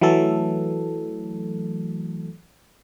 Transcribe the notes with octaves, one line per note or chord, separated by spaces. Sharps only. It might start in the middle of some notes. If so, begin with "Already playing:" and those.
E3 F#3 A3 A4